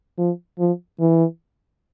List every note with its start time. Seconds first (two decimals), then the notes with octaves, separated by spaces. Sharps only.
0.18 F3
0.59 F3
1.00 E3